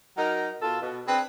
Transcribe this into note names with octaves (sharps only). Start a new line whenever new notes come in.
F#3 D#4 A#4
B2 F4 A4
B2
C4 D4 G#4 B4